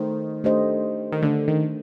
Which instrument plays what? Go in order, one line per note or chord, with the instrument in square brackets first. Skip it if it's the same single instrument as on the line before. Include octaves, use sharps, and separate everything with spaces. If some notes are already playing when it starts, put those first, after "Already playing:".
Already playing: [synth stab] D#3 [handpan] A3 D#4 A4 C5
[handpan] A3 D4 G4 C5 D#5
[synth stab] D#3
[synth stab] D3 [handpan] A3 D4 A4
[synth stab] D#3